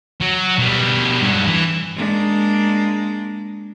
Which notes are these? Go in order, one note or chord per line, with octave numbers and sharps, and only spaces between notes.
F#3
B2 G3
G2 F#3
E3
G#3 A#3 D4